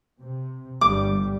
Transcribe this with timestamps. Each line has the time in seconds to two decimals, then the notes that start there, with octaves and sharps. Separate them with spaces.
0.20 C3
0.81 G1 G2 G3 D6